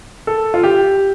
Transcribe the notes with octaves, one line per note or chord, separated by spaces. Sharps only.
A4
F4
G4